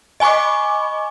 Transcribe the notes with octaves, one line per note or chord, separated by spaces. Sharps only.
D#5 G#5 B5 C#6 D6